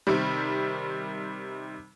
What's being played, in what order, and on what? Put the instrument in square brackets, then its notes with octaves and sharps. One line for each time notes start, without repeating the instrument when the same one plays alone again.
[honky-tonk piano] C3 D#3 G3